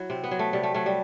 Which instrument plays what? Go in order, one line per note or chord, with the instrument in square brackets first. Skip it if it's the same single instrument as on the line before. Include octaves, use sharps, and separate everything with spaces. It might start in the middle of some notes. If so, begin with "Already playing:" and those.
Already playing: [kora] F#3 E4
C3 C4
B3
F#3
A3
C3 G3
A3
F#3 A3
G3